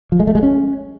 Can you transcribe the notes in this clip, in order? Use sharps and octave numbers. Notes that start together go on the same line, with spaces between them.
F3
G#3
A3
G#3
C#4